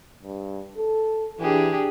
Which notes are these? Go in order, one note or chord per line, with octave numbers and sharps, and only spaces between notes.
G2
A4
E3 D4 G4 G#4